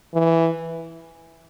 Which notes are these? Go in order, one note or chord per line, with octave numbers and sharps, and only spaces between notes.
E3